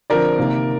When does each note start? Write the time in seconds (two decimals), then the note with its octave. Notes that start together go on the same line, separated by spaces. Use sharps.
0.10 D3 F3 C4 A#4 D5
0.38 C3 D#3 A#3